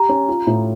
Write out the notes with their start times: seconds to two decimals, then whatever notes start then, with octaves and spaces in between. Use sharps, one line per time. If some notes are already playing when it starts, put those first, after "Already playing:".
Already playing: G4 A#5
0.09 C#4
0.29 F4
0.47 A2